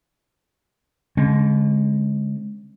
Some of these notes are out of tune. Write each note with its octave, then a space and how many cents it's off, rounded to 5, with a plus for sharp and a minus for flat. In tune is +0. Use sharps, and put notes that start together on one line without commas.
D3 -45 G#3 +0 C4 +40